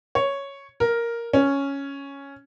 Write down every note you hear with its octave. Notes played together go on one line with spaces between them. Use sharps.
C#5
A#4
C#4